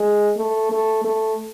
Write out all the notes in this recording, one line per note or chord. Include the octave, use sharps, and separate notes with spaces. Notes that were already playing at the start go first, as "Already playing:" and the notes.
Already playing: G#3
A3
A3
A3